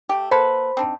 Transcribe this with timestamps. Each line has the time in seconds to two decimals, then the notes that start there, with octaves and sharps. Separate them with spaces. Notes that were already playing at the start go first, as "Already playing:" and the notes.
0.09 A3 G4
0.31 A#3 A4 B4 C5 B5
0.77 C4 D4 D#4